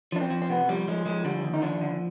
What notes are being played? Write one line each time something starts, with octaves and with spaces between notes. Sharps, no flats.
F3 D4
C4
F3
C4
C3 B3
F3 G3
F3 G#3
F3 G#3
D3 G3
D#2
D#4
F3 D4
D3